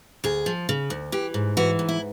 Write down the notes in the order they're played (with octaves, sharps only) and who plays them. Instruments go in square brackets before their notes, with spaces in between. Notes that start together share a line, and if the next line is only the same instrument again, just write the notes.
[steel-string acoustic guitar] D2 G#4
F3
C#3
D2
E3 G4
G#2
E3 F#4
G#2
E4